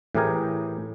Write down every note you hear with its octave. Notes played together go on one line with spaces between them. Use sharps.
A2 E3 G4 G#4 A#4 G#5